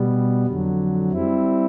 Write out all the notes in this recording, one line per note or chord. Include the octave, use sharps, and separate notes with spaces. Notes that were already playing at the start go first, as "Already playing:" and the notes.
Already playing: B2 G3 B3
F2 D3 F#3
G3 C4 E4